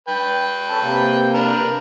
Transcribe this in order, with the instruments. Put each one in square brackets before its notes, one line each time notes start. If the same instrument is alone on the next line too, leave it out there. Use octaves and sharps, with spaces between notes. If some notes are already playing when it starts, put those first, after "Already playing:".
[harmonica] B4 G5
[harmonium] C#4 A4 A5
C3 A#3
[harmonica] D4 A#4 B4